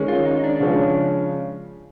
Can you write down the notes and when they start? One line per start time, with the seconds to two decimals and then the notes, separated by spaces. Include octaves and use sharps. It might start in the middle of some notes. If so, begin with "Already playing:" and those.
Already playing: D#3 G#3 C#4
0.08 F4
0.25 D#4
0.44 D4
0.60 C#3 F3 G#3 C#4